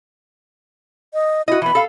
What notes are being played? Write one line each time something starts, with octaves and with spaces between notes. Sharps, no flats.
D#5
E4 F#4 D#5
E3 B3 B5
A4 F5